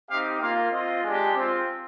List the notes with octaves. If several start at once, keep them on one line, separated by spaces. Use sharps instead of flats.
C4 D#4 G4 F5
A#3 F4 F5
C4 F4 D#5
G#3 D4 G4
C4 F4